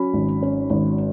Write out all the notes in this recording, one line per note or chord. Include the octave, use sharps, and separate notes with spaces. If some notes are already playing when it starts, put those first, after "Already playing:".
Already playing: F#3 C#4 B5
G#1
C#4
G#1